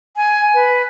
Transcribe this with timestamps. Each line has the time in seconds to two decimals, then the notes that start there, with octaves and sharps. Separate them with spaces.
0.16 G#5
0.54 B4